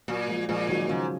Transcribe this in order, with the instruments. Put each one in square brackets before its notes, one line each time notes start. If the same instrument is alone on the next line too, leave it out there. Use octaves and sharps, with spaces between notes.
[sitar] A#2 [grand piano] F#3 A#3
[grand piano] F3 G#3
[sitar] A#2 [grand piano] F3 G#3
[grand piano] D#3 F#3
[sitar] G#2 [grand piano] C#3 F3